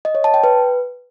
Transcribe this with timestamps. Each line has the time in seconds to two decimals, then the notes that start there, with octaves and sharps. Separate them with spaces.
0.05 D#5
0.15 C#5
0.24 A5
0.34 G5
0.44 B4